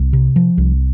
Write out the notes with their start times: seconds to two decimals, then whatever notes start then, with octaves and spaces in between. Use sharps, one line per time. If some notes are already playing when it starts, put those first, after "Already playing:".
Already playing: C2
0.13 C3
0.36 F3
0.57 C2